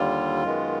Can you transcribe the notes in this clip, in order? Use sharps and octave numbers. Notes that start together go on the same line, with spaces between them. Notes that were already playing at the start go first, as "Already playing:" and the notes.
Already playing: D#2 D3 G3 F4
F#2 D#3 G#3 B3